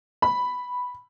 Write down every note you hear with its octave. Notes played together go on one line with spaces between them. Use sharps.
B5